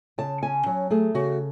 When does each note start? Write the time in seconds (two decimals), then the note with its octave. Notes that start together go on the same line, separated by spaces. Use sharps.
0.18 C#3 A5
0.42 C#4 G#5
0.66 F#3
0.90 A3 G#4
1.14 C#3 F#4